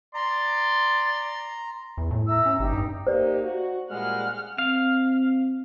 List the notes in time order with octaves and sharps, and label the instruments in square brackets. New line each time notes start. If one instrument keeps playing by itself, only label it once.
[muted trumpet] D5 [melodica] A#5 [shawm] C6
[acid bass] E2
A2
[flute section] E5 A#5 E6
[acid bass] C#4
[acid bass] G1 [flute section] D#4 G4
[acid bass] G2
[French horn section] A#3 D#4 G4 [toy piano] C5 D5
[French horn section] F#4
[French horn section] A#2 G3 G#3 [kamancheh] F#5 F6
[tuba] C4 [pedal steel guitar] F5